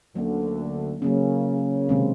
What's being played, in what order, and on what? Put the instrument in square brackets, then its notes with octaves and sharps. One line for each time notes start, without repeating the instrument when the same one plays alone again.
[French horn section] D2 D3 [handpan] F#3 A#3 C#4
[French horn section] C#3 [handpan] F#3 A#3 C#4
[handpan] C3 D#3 G#3 C4